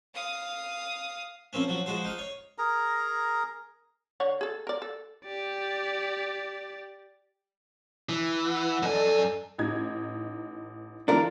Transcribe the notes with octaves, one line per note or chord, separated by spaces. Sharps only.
F5 D#6
F3 A#3 C4 C#4
F3 F#3
F3 G#3 F#4 C5
D#4 F5 D#6
C#5
G#4 A#4 A#5
D3 C#5 F#5
G#4 A4
A#4 D5
A4
G4 D5
E3
F#5
F#2 A4 D5 D#5 G#5
A1 D#4 G#6
E3 D4 F4 A#4